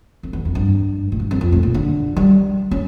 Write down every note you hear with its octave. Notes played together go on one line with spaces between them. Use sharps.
F2
E2
F2
G2
A2
G2
F2
F2
A2
A#2
D3
G3
C#4